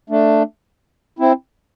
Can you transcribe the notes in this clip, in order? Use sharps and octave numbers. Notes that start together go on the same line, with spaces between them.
A3 D4
C4 E4